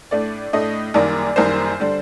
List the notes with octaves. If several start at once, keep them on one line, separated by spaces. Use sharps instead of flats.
A2 A3 D4 D5
A2 A3 D4 D#5
F#1 F#2 D#3 G3 A#3 D5
F#1 F#2 D#3 G3 A#3 C5
D3 G3 D4